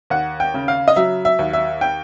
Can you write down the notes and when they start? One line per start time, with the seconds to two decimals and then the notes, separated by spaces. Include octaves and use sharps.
0.10 D#2 F#5
0.40 G5
0.54 C#3
0.68 F5
0.88 D#5
0.96 F#3 E5
1.25 E5
1.39 D#2
1.53 E5
1.81 G5